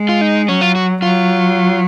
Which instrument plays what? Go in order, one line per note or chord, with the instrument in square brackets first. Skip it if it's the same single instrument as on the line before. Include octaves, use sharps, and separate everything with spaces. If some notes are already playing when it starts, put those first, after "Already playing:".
Already playing: [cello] G#3
[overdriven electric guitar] F4
D#4
[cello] F#3 [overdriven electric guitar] C#4
[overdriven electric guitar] F4
F#4
[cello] F#3 [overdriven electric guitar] F4